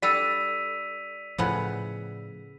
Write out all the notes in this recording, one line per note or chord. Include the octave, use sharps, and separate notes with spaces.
G3 D4 A4 D5 E6 B6 D#7 F7
A2 C#3 F3 B3 F#5